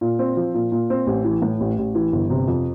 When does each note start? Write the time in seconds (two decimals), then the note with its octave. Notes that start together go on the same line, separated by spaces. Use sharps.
0.01 A#2
0.19 C4
0.36 F3
0.54 A#2
0.72 A#2
0.90 C4
1.07 A1
1.25 E3
1.42 A2
1.60 A1
1.78 A1
1.95 E3
2.12 G1
2.30 C3
2.47 F2